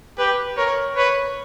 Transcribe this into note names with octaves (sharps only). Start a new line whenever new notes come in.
G4 B4
A#4 C#5
B4 C#5